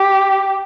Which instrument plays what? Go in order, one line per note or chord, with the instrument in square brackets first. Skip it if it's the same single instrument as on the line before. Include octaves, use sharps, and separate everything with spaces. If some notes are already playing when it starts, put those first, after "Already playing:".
Already playing: [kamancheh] G4